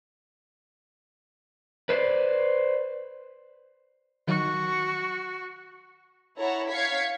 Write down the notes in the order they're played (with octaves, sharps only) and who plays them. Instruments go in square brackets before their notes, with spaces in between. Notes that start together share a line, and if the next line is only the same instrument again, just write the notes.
[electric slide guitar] B4 C5 D5
[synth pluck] D#3 F#3 [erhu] F#4
[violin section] E4 A4 C#5 F#5 A#5
C#5 F5 G#6 B6 C#7